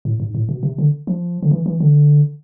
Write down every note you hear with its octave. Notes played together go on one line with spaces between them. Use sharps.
A2
G#2
A2
B2
C3
D3
F3
D3
E3
E3
D3